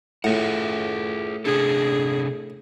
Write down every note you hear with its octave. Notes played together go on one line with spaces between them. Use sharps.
A2 F4 G#4 F#5
C3 D4 G#4 A4